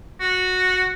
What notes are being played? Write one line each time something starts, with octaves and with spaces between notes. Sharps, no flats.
F#4